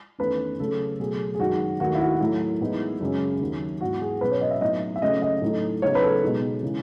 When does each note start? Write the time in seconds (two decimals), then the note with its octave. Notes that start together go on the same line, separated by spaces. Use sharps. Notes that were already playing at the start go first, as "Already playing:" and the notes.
0.19 E2 D#3 A3 C#4 B4
0.59 C#3 F#3 A3 C#4 A4
1.00 B2 F#3 A3 G#4
1.35 G#4
1.39 F#2 D#3 G#3 D#4 F#4
1.80 D#2 D#3 A3 F#4
1.95 E4
2.00 F#4
2.20 A2 F#3 A3 E4
2.60 A2 E3 G#3 B3 D#4
3.01 F#2 C#3 G#3 C#4
3.41 D#2 D#3 F#3
3.80 G#2 E3 B3 F#4
4.01 G#4
4.21 B2 F#3 C#4 B4
4.31 C#5
4.41 D#5
4.51 E5
4.61 A2 F#3 B3 D#4 D#5
4.96 E5
5.02 C#3 F#3 A3 C#4 D#5
5.22 D#5
5.42 A2 F#3 A3 D#4
5.82 C#3 F#3 B3 D#4 C#5
5.95 B4
6.02 A4
6.23 B2 G#3 D#4
6.63 C#3 E3 G#3